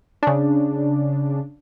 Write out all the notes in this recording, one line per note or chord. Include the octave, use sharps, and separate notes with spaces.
C#3 D4